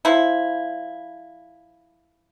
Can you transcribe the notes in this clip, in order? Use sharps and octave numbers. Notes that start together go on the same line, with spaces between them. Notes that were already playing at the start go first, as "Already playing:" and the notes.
F3 E4